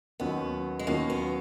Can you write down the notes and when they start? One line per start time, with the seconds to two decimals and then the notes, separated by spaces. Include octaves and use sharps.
0.20 D#2 D#3 F#3 B3 C#4
0.79 G#3
0.87 D#2 D#3 F#3 A#3 C#4
1.10 B3